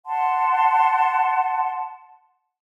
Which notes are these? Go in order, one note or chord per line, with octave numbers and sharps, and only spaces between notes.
F#5 A5 C6